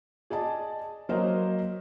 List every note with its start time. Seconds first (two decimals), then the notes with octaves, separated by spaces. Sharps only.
0.30 G#4 D5 D#5 A5
1.09 F#3 A#3 A#4 C5 C#5 D#5